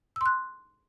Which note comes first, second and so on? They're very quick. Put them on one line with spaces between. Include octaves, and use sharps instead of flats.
E6 C6 F#6